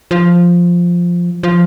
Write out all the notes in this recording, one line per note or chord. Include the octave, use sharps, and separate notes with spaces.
F3
F3